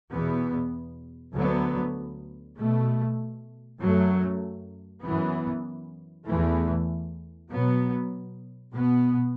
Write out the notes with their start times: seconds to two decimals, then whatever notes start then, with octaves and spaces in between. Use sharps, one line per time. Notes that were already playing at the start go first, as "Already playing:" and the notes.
0.11 E2 B2 B3
1.34 D2 D3 F#3 B3
2.57 B2 A3
3.79 F#2 F#3 A3
5.02 F#2 E3 B3
6.26 E2 E3 A3
7.50 B2 F#3 B3
8.72 B2 B3